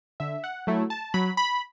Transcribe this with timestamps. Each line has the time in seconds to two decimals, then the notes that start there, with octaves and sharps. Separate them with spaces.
0.20 D3 E5
0.44 F#5
0.67 F#3 A3 E4
0.90 A5
1.14 F#3 B5
1.37 B5